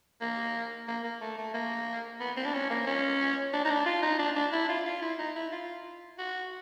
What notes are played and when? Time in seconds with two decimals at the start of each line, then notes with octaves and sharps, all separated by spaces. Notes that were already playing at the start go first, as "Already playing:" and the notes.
0.21 A#3
0.88 A#3
1.04 A#3
1.21 A3
1.37 A3
1.54 A#3
2.20 B3
2.37 C4
2.45 D4
2.54 C#4
2.70 A#3
2.87 C#4
3.53 D4
3.65 D#4
3.70 D4
3.86 F4
4.02 D#4
4.19 D4
4.36 D4
4.52 E4
4.69 F4
4.86 F4
5.02 E4
5.19 D#4
5.36 E4
5.52 F4
6.18 F#4